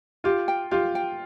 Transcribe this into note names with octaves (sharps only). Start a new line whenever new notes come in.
F4 G4
G5
F4 G4
G5